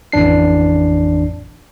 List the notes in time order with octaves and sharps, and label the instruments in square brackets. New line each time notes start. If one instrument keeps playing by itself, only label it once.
[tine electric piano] A1 F2 E3 D4 C7